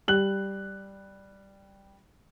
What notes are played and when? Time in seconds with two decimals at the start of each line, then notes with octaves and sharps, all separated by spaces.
0.08 G3 F#6 F#7